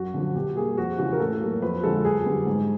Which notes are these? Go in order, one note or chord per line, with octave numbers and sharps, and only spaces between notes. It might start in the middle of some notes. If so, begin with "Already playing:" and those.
Already playing: F#2 F#4
D3 F3
B2 G4
G3 A#3 G#4
F2 F#4
C#3 E3 F#4
A#4
A2 A4
F#3 A#3
F2 B4
D3 F3 G#3 A4
F#2 G#4
D3 G3 B3
G#2